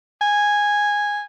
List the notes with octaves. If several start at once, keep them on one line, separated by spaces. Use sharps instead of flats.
G#5